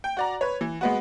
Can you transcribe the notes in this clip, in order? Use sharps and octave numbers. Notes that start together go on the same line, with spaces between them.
G5
F#4 D5 A#5
B4 C#5
E3
G#3 B3 F#4